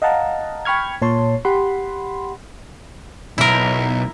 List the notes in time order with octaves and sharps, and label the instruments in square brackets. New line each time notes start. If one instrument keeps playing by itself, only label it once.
[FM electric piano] D#5 F5 F#5 A5 A#5
G5 B5 C#6 F6 G#6
A#2 C#5 A5 C6
G4 F#5 B5 C6
[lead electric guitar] B1 [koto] E4 A#4